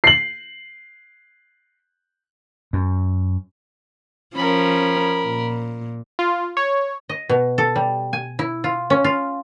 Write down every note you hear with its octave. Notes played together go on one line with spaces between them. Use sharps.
C7 F#7
F#2
F3 C#4 A#4 B5
A#2
F4
C#5
D#5
B2
A4
G3
G#5
E4
F4
C#4
F4